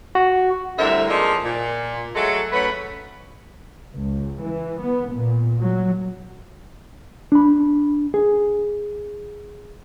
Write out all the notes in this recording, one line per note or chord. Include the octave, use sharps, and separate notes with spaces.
F#4
A2 D3 G3 C4 A#4 E5
F3 G#3 A#3 C4 D4 D#4
A#2
F#3 G#3 A3 A4
F#3 A3 C#4 B4
C#2
E3
B3
A#2
F#3
D4 B5
G#4